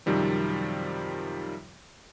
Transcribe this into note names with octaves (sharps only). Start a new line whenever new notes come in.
F#2 C3 D#3 F3 G3 C4